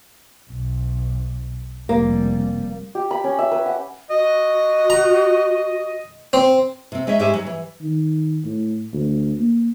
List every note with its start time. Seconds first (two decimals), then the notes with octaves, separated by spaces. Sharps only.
0.51 B1
1.89 F1 G3 A#3
2.95 G4
3.11 B5
3.24 C#4
3.39 E5
3.51 B4
3.66 F#5
4.10 F#4 D#5
4.90 A#5
6.33 C4
6.92 C3 C4
7.07 G#3 D#4 C#5 E5
7.19 G#2 G#3 C#4 G4 E5 G#5
7.34 F#3
7.47 E3
7.82 D#3
8.45 A2
8.93 D2
9.39 A#3